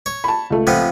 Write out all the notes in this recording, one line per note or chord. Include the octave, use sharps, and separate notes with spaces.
C#5
A5 B5
C#2 A3
C3 F3 B3